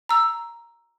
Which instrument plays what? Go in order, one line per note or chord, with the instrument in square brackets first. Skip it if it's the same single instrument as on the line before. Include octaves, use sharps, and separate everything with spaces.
[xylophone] A#5 E6